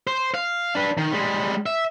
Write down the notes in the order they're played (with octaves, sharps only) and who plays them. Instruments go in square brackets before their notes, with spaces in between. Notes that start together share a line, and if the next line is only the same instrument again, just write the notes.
[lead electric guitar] C5
F5
D4 B4
D#3
G3 G#3
E5